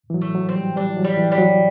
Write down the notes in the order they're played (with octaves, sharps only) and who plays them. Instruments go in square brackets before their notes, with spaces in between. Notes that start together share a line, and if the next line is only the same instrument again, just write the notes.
[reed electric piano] E3
F#3
[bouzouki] A3
[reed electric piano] F#3
[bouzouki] C4
[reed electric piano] G3
[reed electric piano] G3 [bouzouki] D4
[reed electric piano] E3
F#3
[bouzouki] G3
[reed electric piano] E3
[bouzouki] G3
[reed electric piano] F#3